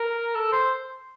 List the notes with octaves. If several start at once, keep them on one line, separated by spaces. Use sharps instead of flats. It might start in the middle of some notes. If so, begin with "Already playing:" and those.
Already playing: A#4
A4
C5